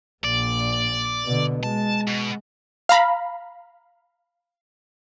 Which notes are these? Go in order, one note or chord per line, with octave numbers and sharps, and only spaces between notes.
A#1 D5
B2 D3
G#3 A5
B2
F5 A#5 B5